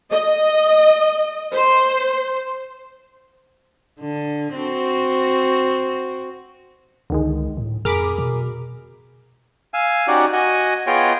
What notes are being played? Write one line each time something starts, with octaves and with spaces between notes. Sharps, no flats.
D#5
C5
D3
C4 F#4
C#2 D3 D#3 G#3
A2
F2 G#4 A#4 B5 D6 F6
B2
F5 G#5 E6
C#4 D#4 F#4 G4 D5
F#4 D#5 G#5
B3 F4 G#4 C#5 D#5 G5